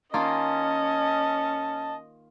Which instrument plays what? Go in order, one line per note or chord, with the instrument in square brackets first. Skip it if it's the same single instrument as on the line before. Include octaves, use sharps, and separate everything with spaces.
[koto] D#3 A#3 F4 [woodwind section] C#4 [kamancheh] D#5 [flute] A5